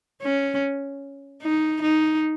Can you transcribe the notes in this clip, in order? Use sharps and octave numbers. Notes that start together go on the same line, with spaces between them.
C#4
D#4
D#4